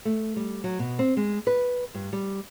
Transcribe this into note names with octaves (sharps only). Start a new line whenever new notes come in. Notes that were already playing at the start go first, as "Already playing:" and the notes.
A3
G3
F#3
B2
C4
G#3
B4
G2
G3